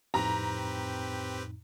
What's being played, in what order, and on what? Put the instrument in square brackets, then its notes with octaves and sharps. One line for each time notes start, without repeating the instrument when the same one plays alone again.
[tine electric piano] F2 A2 D#4 [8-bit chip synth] C4 G4 B4 [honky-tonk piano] A#5